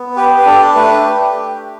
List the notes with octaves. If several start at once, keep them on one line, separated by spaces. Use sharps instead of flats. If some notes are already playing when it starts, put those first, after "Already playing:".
Already playing: B3
G4 B4
B4
D4 A4
A3 B4
G4